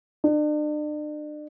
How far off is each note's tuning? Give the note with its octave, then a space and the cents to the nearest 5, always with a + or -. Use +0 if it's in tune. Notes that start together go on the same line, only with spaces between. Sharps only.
D4 +40